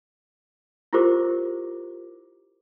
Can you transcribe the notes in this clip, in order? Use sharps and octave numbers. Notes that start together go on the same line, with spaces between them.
E4 F4 G4 A#4 C5 D6